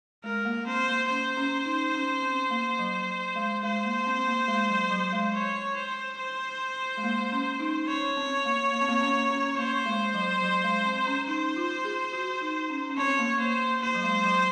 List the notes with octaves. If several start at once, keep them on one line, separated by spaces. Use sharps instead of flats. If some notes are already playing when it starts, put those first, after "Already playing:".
G#3 A#4
A#3
C4 C5
A#3
C#4 C5
C#4
D#4
C#4
C4
A#3
F#3
G#3
G#3 C5
A#3
C4
A#3
G#3
F#3
F#3
G#3
C#5
C5
C5
G#3
A#3
C#4
D#4
C#4 C#5
C4
A#3
A#3
C4
A#3
C#4
C#4
A#3 C5
G#3
F#3
F#3
G#3
C4
C#4
D#4 C5
F4
G#4
F#4
D#4
C#4
C#4
C4 C#5
A#3
A#3 C5
A#3 C5
F#3
G#3
F#3